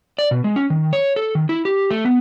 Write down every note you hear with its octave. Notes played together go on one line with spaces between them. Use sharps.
D5
B2
G#3
C#4
D#3
C#5
A4
D#3
E4
G4
A3
B3